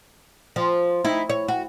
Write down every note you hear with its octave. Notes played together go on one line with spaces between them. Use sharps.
F3
D#4 E4
C#5
F#4